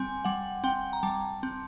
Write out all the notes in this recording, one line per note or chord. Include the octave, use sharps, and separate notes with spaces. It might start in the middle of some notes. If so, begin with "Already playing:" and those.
Already playing: G3 C4 G#5
G3 F#5
C4 G5
A#5
G3 A5
C4